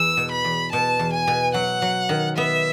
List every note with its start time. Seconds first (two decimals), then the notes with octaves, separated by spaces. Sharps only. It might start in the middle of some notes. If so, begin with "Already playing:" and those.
Already playing: E2 E6
0.17 B2
0.31 B5
0.44 E2
0.72 B2 A5
0.99 E2
1.13 G#5
1.27 B2
1.54 F#3 F#5
1.82 F#3
2.09 D#3
2.37 B3 E5